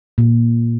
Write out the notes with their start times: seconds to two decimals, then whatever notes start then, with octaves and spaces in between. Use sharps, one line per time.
0.18 A#2